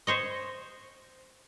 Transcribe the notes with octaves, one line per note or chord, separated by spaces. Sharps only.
C5 C#5 D#5